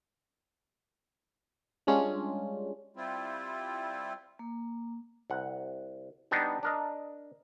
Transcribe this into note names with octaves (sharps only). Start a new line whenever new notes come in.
G3 G#3 C#4 D4 F4
G3 C4 E4 F4
A#3
C2 F#5
G3 B3 D4 D#4
D4 A#4 D#5